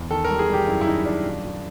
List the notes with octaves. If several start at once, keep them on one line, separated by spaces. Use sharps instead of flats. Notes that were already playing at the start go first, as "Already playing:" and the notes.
Already playing: E2
D#3 A4
A#4
G3
G#4
G3 G4
F#2 E4
E4
D#3 D#4
F#2 D4
A#2
A#2